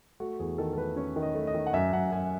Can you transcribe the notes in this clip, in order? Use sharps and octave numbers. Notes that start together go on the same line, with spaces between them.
A3 F#4
E2 G#4
D#3 A4
A4
A3 B4
C#4 C#5
D#3
D#5
A3
D#5
D#3
F#5
F#2 E5
F#2 F#5
F#2 G#5